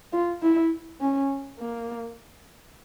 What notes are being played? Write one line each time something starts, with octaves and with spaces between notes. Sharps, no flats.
F4
E4
C#4
A#3